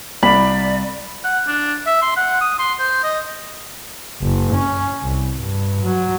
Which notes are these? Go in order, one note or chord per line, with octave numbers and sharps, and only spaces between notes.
C2 D5 B5
F#5
D4
E5
C6
F#5
D#6
C6
C5
D#5
F#1
C#4
C2
G2
F#3